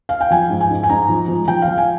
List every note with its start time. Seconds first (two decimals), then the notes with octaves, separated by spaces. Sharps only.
0.09 F5
0.21 G5
0.31 F3 G#5
0.50 G#2
0.61 G#5
0.70 G#2
0.83 G#5
0.90 G#2 A#5
1.09 F3
1.28 F3
1.48 F3 G5
1.62 F5
1.68 F3
1.78 G#5